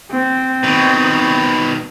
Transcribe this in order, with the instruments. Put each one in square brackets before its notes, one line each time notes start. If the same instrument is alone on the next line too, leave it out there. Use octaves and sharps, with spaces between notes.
[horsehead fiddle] C4
[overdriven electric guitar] B2 D#3